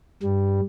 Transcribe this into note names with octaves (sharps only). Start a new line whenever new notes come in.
G2 G3